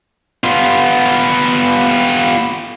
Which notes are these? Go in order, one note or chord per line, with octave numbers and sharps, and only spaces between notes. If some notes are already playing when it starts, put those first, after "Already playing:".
B3 F4